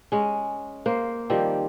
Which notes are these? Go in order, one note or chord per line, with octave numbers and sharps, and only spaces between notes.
G#3 C#4
A#3 C5
D#3 F3 G3 C4